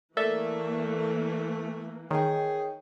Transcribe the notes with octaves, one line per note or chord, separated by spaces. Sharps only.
E3 A3 A#3 A4 A#4 D5 E5
D#3 G#4 C#5 G5